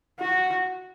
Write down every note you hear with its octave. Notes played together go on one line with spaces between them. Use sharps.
F#4